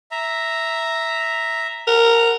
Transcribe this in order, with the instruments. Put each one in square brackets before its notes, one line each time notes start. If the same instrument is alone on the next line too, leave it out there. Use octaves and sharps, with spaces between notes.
[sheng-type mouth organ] E5 A#5
[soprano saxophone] A#4 [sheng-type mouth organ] F#5